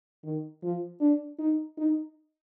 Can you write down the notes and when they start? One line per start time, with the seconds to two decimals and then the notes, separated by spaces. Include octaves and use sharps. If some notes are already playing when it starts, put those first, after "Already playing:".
0.24 D#3
0.63 F3
1.01 D4
1.39 D#4
1.78 D#4